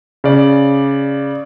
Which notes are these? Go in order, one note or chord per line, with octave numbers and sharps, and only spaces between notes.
C#3 D5